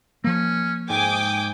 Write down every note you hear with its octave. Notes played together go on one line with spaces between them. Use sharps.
F3 A#3 C#4
G#2 G5 G#5 D6 D#6